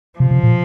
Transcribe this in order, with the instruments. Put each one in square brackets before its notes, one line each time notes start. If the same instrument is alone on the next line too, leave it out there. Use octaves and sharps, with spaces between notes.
[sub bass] C3 [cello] F3
[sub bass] C3
A#2